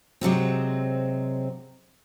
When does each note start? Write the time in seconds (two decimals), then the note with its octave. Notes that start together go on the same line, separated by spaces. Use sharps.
0.21 C3 F#3 G#3 C4